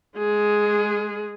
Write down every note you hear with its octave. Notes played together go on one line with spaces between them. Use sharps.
G#3 G#4